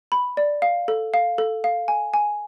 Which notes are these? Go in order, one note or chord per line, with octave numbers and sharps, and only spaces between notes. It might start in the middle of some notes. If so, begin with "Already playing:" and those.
B5
D5
F5
A4
F5
A4
F5
G#5
G#5